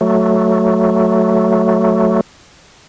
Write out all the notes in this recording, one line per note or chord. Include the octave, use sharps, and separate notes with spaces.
F#3 A3